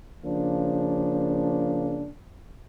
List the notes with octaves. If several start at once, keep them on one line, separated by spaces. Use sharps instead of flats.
C#3 F3 A#3 D4